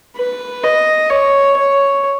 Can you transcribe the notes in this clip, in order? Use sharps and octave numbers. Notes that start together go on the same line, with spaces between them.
B4
D#5
C#5
C#5